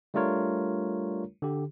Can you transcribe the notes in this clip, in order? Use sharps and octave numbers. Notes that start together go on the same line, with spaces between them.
G3 A3 D4 F4 A#4 C#5
D3 G4